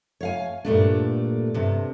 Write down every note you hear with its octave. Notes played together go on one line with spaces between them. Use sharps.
C#5 F5 G#5
G2 A#2 A3 D4
G2 C3